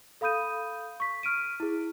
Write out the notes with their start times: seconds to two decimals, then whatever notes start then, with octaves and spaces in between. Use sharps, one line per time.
0.21 A4 F5 B5 D#6 G6 D#7
1.00 C#6 B6
1.23 F6 D7 D#7
1.60 E4 G#4